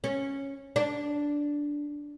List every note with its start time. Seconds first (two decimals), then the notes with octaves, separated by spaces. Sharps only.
0.04 C#4
0.76 D4